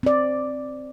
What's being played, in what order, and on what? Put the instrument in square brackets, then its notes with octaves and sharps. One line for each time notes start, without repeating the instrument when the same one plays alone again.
[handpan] C4 D5